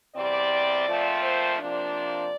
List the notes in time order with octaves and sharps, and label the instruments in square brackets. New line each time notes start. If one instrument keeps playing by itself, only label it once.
[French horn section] E2 C3 G3 C4 D5
A#2 F3 A3 C4
C5
C3 F3 A#3 D4 D5